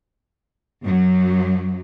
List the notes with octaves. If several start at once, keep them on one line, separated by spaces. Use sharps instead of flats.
F#2 F#3